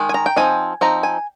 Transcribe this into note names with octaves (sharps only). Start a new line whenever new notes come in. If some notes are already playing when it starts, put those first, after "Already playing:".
Already playing: D#3 G#3
G#5
A#5
G5
F3 C4 D#4 G#5
F3 C4 D#4 A#5
G#5